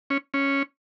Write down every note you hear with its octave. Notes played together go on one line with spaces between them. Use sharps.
C#4
C#4